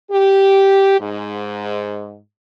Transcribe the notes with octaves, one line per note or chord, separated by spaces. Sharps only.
G4
G#2